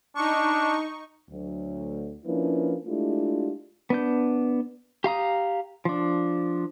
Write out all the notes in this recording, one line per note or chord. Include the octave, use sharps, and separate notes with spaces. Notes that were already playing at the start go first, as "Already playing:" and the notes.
D4 D#4 C#6
D2 F#3
F3 A#3 C#4 D4 E4 B4
G#3 A3 D4 E4 F4 G4
B3 D4 G6
G4 F5 A#5 D#6
F3 D4